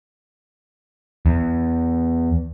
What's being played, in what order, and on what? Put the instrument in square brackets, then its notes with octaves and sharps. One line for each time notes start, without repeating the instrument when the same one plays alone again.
[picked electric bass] E2